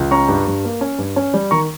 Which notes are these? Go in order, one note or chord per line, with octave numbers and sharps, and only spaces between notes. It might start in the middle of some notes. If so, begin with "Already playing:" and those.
Already playing: C#2
C#4 A#5 C#6
G2
G2
A#3
C#4
G2
C#4
G3
D#3 A#5 C#6